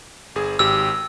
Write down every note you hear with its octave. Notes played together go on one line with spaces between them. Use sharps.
G1 G#4
G#1 G4 E6